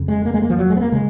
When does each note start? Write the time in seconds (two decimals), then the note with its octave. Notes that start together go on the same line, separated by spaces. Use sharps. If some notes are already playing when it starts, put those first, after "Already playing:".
Already playing: F2 C#3
0.08 G#3
0.25 A#3
0.34 G#3
0.42 A#3
0.50 F3
0.58 F#3
0.70 G#3
0.77 B3
0.81 A#3
0.92 C#3 G#3